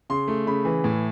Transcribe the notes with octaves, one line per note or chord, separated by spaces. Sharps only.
C#3 C6
A3
C#3 B5
E3
A2